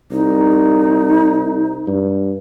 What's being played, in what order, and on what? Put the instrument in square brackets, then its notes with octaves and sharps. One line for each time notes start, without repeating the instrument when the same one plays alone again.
[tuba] C2 [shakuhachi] D#4
[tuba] G2